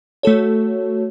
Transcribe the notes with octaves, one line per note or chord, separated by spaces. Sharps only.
A3 F#4 A4 C#5